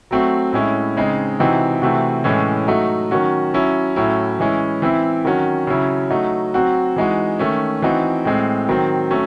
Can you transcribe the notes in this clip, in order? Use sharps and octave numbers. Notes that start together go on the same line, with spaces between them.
F#3 A3 C4 F#4
A2 G#3 C#4 E4
C#3 G#3 C4 D#4
C3 E3 C4 D#4 F#4
C3 E3 A3 C4 F#4
A2 E3 G#3 C#4
F#3 A3 D#4 F#4
D#3 F#3 C#4 F#4
F#3 C#4 E4
A2 F#3 C#4 E4
E3 G#3 C#4 E4
E3 C4 E4
D#3 F#3 C#4 F#4
C#3 F#3 C#4 E4
F#3 A3 D#4 F#4
F#3 C4 F#4
E3 G#3 D#4 F#4
D#3 A3 C#4
E3 C4 D#4 F#4
A2 G#3 C4
D#3 F#3 C4
F#3 A3 C#4